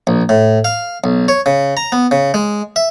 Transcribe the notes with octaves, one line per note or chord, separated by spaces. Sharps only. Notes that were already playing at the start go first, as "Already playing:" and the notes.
A#1
A2
F5
B1
C#5
C#3
A#5
B3
C#3
G#3
E5